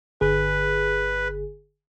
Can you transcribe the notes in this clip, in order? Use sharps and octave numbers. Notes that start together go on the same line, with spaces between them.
G1 D3 G#4 B4